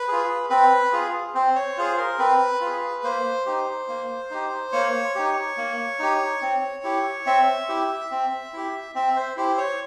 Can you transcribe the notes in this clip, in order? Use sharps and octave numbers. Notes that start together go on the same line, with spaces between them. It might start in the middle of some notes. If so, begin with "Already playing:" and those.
Already playing: B4
F4 G#4
C4 B4
F4 G#4
C4 C5
C#5
F4 G#4 C5
A#4
C4 B4
F4
G#4
A#3 C5
D#4 G4
A#3
D#4 G4
A#3 C#5
D#4 G4
A#3
D#4 G4
C4
E4 G4
C4 E5
E4 G4
C4
E4 G4
C4 E5
C5
E4 G4 C5
C#5